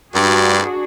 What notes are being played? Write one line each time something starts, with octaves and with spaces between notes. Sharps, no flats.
G2 D4 F#4 G#4